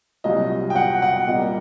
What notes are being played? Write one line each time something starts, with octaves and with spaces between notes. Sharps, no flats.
C2 A#2 F#3 D#5
G5
F#5
F#5
A#2 G3 A#3 D#5